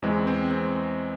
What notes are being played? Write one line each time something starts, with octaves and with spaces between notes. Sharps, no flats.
E2 E3 G#3 C4
C4
C4